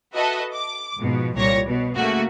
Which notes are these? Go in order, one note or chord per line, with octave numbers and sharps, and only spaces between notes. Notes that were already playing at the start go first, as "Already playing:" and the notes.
F#4 A4 B4 D#5 E5
D6
G#2 B2 F3
C2 A#2 G3 C#5 A#6 C#7
B2
C#3 A3 A#3 F#4